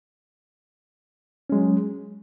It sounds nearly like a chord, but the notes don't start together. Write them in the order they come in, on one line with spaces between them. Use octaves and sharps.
C#4 G#3 F#3